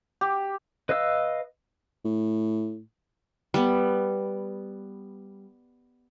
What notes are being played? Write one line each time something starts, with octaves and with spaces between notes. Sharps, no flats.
G4
B4 D#5 F5 E6
A2
G3 B3